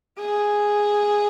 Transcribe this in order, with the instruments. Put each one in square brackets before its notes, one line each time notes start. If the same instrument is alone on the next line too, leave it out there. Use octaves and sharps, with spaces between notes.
[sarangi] G#4